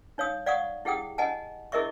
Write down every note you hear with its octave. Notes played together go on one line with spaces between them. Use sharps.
D#4 C#5 F5 D#6
D5 F5 F#5 C#6 D#6
E4 G4 G#4 F#5 G5 D#6
D#5 F#5 G#5 A5
E4 G#4 A#4 D#5 E5 C#6